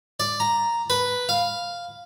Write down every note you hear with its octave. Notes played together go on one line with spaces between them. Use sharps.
D5
A#5
B4
F5